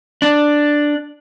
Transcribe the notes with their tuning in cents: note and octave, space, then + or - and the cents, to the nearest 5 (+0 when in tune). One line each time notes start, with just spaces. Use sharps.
D4 +5